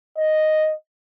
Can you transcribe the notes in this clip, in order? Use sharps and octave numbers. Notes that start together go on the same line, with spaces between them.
D#5